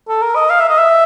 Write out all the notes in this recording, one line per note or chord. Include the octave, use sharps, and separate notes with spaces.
A4
A#4
D#5
F5
E5
D#5
E5